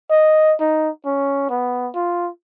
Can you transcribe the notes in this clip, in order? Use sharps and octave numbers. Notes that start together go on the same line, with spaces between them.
D#5
D#4
C#4
B3
F4